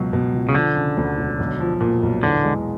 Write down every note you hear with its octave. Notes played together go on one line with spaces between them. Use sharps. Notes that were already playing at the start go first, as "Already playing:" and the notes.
Already playing: C#2 B2 F#3
B2
C#2
C#3
D3 F3
C#3
D2
E1
B1
F3
A#2
B1
E2 D3
G#3